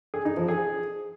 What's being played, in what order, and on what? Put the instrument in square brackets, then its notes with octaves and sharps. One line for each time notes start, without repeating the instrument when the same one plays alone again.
[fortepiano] G#4
D#4
F3
G#4